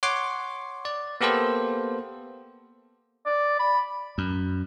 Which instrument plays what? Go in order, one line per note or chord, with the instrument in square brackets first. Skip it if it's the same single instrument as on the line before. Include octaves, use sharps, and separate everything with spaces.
[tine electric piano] C#5 F#5 C6 D6
D5
A#3 B3 G4 A4 C5
[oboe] D5
B5
[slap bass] F#2